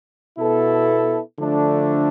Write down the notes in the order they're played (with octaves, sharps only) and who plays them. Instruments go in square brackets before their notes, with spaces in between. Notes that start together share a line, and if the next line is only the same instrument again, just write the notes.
[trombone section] B2 B3 E4 A4
D3 F3 A3 D4